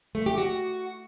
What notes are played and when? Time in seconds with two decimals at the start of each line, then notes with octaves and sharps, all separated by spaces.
0.15 A3
0.26 G4
0.38 F#4